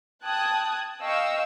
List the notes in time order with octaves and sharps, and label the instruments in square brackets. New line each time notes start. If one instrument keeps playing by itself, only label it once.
[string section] G5 A5 D#6 F#6 G#6
D#5 F5 G5 C#6 E6